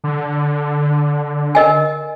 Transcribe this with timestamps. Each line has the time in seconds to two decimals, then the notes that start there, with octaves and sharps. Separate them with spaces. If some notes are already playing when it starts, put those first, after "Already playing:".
0.04 D3
1.55 A#4 D#5 G#5